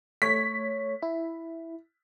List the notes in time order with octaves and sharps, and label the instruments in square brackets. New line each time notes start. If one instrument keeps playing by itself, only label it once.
[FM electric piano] A3 C#5 [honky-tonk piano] B6
[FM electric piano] E4